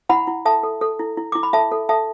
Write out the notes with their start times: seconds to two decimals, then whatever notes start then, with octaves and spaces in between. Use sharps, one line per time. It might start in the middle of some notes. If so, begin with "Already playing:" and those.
0.09 E4 F#5 B5
0.27 E4
0.45 A4 E5 A5
0.63 A4
0.81 A4
0.99 E4
1.17 E4
1.32 E4 D6
1.43 B5
1.53 A4 E5 A5
1.72 A4
1.89 A4 E5 A5